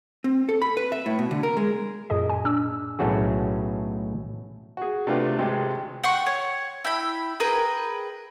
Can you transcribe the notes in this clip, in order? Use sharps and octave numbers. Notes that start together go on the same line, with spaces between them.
C4
A4
B5
B4
E5
A2
B2
D3
A#4
G#3
F#2 A#2 G#4 D#5
G#5
A#2 D4 E6
B1 A2 A3 C#4 F#4 G#4
F#4 G#4
C3 A3 D4 F4 B4
G#1 C3 G#3
F#5 G5 C6 C#6
C#5
E4 G5 B5
G#4 A#4 B4 G5